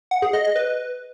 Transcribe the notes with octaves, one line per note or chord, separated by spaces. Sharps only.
F#5
G#4
D#5
D#5
B4